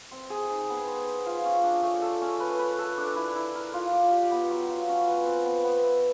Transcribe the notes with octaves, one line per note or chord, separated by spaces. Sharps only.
C4
G#4
D#4
B3
C5
C5
F4
C#4
D4
A3
A4
C#4
B4
B4
A4
D4
E4
E4
A#4
F4
D5
G4
B3
F#3
F4
C#4
B4
C4
B3
B3
E5